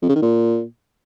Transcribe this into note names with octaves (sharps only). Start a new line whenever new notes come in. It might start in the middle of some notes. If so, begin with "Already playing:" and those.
F2
C#3
D#3
A#2